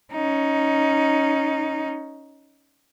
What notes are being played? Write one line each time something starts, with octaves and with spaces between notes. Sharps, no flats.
C#4 D#4